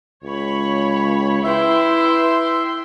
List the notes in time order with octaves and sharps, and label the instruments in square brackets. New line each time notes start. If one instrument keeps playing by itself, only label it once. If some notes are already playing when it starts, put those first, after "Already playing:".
[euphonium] C#2 [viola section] C#5 B5
[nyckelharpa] E4 [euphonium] B4 [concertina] E5 [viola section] G5 C6